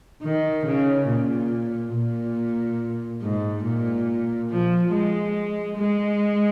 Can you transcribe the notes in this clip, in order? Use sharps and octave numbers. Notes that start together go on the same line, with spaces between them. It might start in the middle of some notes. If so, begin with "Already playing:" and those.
D#3
C#3
A#2
A#2
G#2
A#2
F3
G#3
G#3